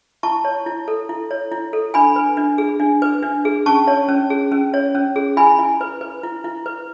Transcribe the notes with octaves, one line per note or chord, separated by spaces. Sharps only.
E4 A5 C#6
C#5
E4
A4
E4
C#5
E4
A4
D4 G#5 B5
B4
D4
G#4
D4
B4
D4
G#4
C#4 A5 C#6
C#5
C#4
G#4
C#4
C#5
C#4
G#4
E4 G#5 B5
E4
B4
B4
E4
E4
B4